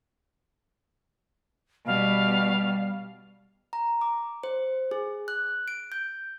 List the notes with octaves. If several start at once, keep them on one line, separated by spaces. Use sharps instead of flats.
B2 G3 F5
A#5
D6
C5
G#4
F#6
D7
G6